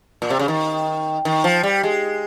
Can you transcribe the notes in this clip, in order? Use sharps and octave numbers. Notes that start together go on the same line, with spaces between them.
A#2
C3
C#3
D#3
D#3
F3
G3
G#3